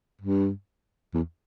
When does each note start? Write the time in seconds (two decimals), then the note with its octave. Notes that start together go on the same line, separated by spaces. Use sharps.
0.21 G2
1.14 E2